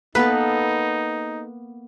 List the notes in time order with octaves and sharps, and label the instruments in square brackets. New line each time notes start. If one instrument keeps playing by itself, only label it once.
[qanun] A#3 B3 A4 [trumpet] D#4 [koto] B4